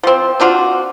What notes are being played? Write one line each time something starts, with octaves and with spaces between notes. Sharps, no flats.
F3 C4
C4 D4 F4 F#4